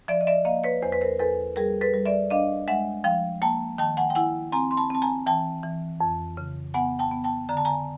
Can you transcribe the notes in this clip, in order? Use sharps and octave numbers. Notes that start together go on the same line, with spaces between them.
F3 D5 E5
D#5
D5 E5
A#3 D#5 F5
B4 C#5
E2 C5
B4
A#4 C5
E2 A4 B4
G3 G#4 A#4
A4 B4
G3
D5 E5
D4 D#5 F5
G#3 E5 F#5
F3 F5 G5
A#3 G5 A5
D#3 G5 A5
F#5 G#5
G5
E4 F#5 G#5
C4 G#5 A#5
C6
A5 B5
C4 A5
G#5 A#5
E3 G5 A5
E3
F2
C#3
B3 F#5 G#5
G5 A5
B3
G5 A5
D3 A#5
A5
G#5 A#5